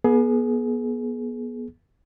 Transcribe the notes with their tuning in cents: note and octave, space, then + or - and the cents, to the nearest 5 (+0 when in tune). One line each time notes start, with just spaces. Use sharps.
B3 -30 G#4 +25